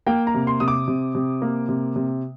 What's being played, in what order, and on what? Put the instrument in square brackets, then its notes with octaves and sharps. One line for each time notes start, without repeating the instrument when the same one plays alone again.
[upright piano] A#3 G5
A#5
C3
C6
C3 D#6
D6
C3
C3
A#3
C3
C3